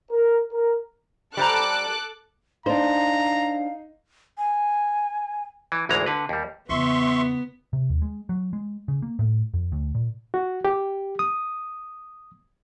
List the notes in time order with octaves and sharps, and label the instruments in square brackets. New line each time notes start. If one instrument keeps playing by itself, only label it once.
[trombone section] A#4
A#4
[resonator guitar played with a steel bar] G3 C5 A#5 [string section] A4 D6 F#6
[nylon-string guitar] D4 C5 [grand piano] D#4 [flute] F5 [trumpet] A#5
[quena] G#5
[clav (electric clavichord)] E3
G#1 D2 E3 G#3 A#5
D3 B4
D#2 G3
[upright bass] E2 C#3 [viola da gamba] B3 [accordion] E5 C6 C#6
[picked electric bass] C3
D#2
G#3
F#3
G#3
C#3
A#3
A2
F2
D2
A#2
[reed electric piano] F#4
G4
D#6